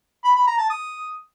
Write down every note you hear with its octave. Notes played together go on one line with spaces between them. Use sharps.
B5
B5
A#5
A5
D#6